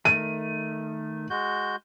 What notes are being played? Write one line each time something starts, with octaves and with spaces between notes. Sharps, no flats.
D#3 A3 D#7
G#3 F#4 G6